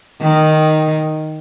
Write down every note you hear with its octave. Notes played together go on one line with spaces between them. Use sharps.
D#3